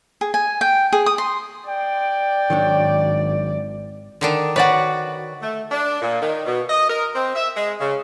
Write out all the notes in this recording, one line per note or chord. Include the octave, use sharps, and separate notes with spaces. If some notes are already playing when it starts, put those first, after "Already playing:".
G#4
G#5
G5
G#4
D#6
C6
D5 G5
G#1 D#3 F#3 D4
D3 D#3 D4
F#4 B4 C#5 D5 F#5
A3
D4
A#2
D#3
B2
D#5
A#4
C4
E5
G#3
C#3